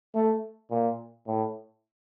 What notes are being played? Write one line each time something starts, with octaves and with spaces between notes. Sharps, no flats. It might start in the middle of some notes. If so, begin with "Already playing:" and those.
A3
A#2
A2